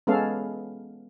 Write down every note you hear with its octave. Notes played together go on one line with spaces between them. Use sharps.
G#3 B3 C#4 A4 F5